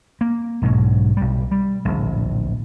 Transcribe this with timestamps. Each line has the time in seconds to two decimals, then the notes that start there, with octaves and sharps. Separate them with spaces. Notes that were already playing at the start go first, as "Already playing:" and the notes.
0.21 A#3
0.62 B1 G#2 B2 F#3
1.17 B1 G3
1.51 G3
1.85 D1 A#1